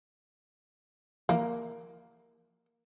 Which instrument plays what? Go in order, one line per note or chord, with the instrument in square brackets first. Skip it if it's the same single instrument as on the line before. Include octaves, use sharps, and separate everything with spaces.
[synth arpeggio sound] E3 F3 [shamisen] A#3